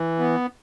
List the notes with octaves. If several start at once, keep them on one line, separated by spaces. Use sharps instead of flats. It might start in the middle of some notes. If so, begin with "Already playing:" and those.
Already playing: E3
B3